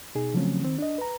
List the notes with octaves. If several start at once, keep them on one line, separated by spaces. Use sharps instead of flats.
B2 D#4 G#4
C#3 F3 F#3 A3 C4 C#4
D#3 C4
D4 D#5
B4 A#5